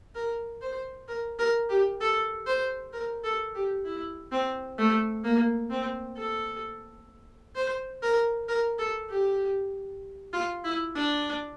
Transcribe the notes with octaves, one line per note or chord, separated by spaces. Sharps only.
A#4
C5
A#4
A#4
G4
A4
C5
A#4
A4
G4
E4
C4
A3
A#3
C4
A4
C5
A#4
A#4
A4
G4
F4
E4
D4